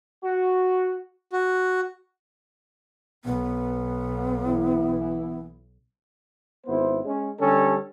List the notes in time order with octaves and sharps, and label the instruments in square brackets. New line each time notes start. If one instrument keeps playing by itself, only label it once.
[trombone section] F#4
[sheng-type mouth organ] F#4
[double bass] B1 [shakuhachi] B3
[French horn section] E3 E4
[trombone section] G#1 B3 E4 C5
G#3 C#4
D3 G3 C#4 G4 A4